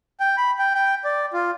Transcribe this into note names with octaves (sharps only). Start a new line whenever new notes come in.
G5
B5
G5
G5
D5
F4